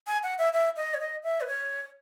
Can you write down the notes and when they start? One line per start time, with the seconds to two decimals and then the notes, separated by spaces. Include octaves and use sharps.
0.07 G#5
0.23 F#5
0.38 E5
0.53 E5
0.77 D#5
0.94 C#5
1.00 D#5
1.23 E5
1.41 B4
1.47 C#5